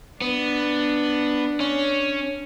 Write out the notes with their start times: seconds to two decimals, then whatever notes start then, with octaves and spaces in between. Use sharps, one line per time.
0.21 B3 D4
1.60 C#4